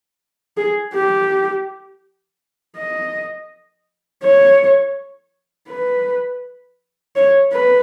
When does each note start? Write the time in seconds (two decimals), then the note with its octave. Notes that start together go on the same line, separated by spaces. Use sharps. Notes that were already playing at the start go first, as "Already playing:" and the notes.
0.57 G#4
0.94 G4
2.77 D#5
4.23 C#5
5.69 B4
7.16 C#5
7.53 B4